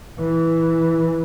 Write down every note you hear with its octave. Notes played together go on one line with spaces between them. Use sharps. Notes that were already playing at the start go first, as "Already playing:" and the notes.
E3